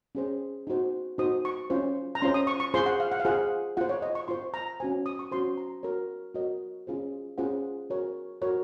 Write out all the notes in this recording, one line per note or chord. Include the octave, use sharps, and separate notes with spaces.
C#4 G#4 C5
D#4 F#4 C5
D#4 F#4 C5 D#6
C#6
C#4 F4 C5
A#5
C#4 F4 C5 C6
D#6
C#6
C#6
F4 G#4 C5 C6
F#5
F5
F#5
F5
F4 G#4 C5 F#5
F4 C5 F#5
C#5
D#5
C#6
F4 C5 C6
A#5
C#4 F#4 C5 G#5
D#6
C#6
C#4 F#4 C5 C6
A#5
F#4 A#4 C#5
F#4 A#4 C#5 D#5
C#4 F4 G#4 C5
C#4 F4 G#4 C5 F#5
F#4 A#4 C#5
F#4 A#4 C#5